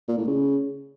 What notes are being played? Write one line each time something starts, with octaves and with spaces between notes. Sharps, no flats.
A#2
A2
C#3